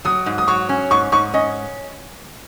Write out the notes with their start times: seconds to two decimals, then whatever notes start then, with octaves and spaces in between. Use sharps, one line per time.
0.05 F#3 D#6
0.26 G#2
0.38 D#6
0.48 F#3 C#6
0.69 C#4
0.91 G#2 C#6
1.12 G#2 C#6
1.34 C#4 D#5